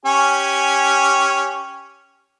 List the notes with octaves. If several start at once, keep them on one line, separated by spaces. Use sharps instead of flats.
C#4 G4 G#5